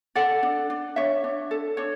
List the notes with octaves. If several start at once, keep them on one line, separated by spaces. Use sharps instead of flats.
A4 D5 F#5
D4
D4
D4 C#5 E5
D4
A4
D4 C#5